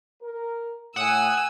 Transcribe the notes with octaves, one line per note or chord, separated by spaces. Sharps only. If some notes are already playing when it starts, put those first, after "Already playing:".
A#4
A2 F#5 G#5 D#6 E6